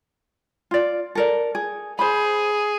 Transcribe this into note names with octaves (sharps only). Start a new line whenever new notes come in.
F4 D5
A4 A#4 D5
G#4
G#4 C5 B5